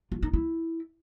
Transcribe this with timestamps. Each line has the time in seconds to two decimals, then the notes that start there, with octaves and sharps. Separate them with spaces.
0.12 F4
0.23 D#4
0.33 E4